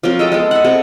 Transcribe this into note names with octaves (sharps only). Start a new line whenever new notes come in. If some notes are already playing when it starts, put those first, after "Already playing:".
F3 F#3 C4 A#4
G#3 A4 D#5 G5
G#3 B3 A4
E5 F#5
C3 A4